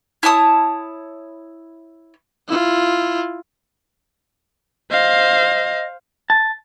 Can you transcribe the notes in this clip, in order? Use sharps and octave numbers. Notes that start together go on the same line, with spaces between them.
E4 C#5 A5 D#6
E4 F4
C5 D#5 F5
A5